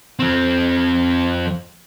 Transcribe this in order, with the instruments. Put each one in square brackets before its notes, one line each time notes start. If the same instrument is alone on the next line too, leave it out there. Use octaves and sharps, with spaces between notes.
[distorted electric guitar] F3 C4